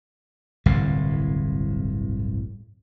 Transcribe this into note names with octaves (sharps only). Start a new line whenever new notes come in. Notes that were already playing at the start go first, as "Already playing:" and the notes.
D1 G1 C2 A2